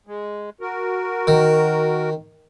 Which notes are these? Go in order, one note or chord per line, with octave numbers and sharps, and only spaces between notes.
G#3
F#4 A#4
D#3